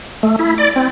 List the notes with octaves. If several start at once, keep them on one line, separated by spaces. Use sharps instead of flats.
A3
E4
D5
C4